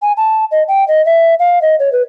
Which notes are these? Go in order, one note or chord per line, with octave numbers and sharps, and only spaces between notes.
G#5
A5
D#5
G5
D#5
E5
F5
D#5
C#5
B4